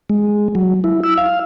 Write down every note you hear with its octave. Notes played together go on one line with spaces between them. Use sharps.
G#3
F#3
E4
E6
F5